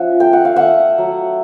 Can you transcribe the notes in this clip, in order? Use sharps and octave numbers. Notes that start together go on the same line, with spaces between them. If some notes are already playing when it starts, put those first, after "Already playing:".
Already playing: F3 C#4 E5 F#5
A3 G5
F#5
F5
A3 E5 F#5
F#3